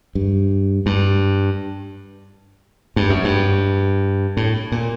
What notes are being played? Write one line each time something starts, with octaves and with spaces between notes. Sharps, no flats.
G2
G2
G2
F#2
G2
A2
A#2